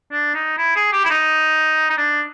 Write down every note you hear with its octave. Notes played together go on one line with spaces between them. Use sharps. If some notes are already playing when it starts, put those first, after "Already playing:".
D4
D#4
E4
G#4
G4
E4
D#4
D#4
D4